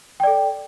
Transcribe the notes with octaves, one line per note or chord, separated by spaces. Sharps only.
A4 D5 G5